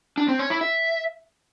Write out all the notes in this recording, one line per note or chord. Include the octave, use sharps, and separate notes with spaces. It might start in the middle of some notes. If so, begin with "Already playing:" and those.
D4
C4
C#5
E4
E5